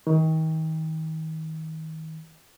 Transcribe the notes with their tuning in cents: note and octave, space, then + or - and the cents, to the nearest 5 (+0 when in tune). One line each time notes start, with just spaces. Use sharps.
D#3 +35